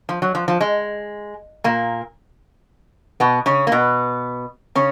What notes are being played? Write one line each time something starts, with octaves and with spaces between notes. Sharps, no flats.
F3
F#3
F3
F3
G#3
A#2 A#3
B2 B3
C#3 C#4
A#3
B2 B3
C#3 C#4